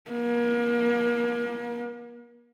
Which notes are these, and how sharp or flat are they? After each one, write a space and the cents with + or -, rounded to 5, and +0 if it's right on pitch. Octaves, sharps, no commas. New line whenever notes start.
A#3 +35